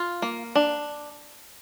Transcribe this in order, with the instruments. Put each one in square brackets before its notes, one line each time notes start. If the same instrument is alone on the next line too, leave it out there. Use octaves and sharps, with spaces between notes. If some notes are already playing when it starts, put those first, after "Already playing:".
Already playing: [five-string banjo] F4
A#3
D4